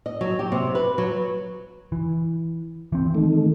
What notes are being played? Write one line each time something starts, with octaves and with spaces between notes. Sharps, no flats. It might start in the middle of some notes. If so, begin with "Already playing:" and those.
D#5
F#3
G4
C3
B4
F#3
E3
E3 C4
D#3 A3